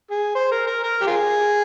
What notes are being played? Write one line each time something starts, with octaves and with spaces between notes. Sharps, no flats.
G#4
C5
A#4
A#4
A#4
G4
F4 G#4